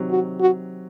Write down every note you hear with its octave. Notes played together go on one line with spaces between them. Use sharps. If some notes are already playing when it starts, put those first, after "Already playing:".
Already playing: C3 D#3 F#3 C4
F#4
F#4